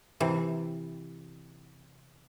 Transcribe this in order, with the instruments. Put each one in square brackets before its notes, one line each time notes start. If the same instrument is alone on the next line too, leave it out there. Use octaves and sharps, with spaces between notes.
[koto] C3 E3